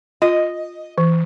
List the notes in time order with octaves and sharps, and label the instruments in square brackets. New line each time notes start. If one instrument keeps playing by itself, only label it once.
[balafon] F4 [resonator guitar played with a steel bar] D#5
[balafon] E3